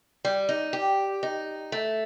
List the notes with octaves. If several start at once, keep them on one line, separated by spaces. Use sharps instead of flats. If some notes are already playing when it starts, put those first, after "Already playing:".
G3
D#4
G4
D#4
A3